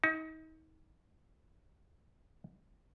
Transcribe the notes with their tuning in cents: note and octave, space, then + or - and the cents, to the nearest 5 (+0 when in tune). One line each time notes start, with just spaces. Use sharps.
D#4 +35